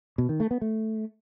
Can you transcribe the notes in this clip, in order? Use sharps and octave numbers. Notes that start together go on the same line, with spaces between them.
B2
D#3
A3
B3
A3